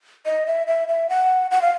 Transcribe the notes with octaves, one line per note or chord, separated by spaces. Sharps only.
D#5
E5
E5
E5
F#5
F#5
F5